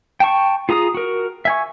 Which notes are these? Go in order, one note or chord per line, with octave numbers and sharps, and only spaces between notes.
G5 A5 C#6
F4 G#4 A#5 D#6
F#4 A#4
E5 G#5 C#6